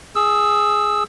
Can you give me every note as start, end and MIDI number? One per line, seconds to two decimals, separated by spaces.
0.15 1.03 68
0.15 1.03 88